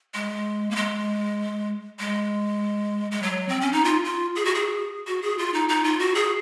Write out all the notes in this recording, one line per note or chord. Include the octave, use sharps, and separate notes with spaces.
G#3
A#3
G#3
G#3
G#3
F#3
C4
C#4
D#4
F4
F4
G#4
F#4
G#4
F#4
G#4
F4
D#4
D#4
F4
F#4
G#4